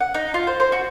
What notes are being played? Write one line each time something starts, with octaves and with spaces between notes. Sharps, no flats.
F#5
D#4
F4
C5
C5
F#4